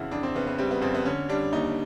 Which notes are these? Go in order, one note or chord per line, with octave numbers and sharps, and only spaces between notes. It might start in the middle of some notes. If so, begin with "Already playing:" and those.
Already playing: F2 C#3 E3 E4 F#4
F2 D4
C4
C#3 B3
B3
G3 C4
B3
F2 C4
B3
D3 C#4
G3 D4
D#2 D#4